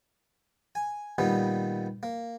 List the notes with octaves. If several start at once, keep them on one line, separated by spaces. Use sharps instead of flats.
G#5
A#2 D#3 G3 B3
A#3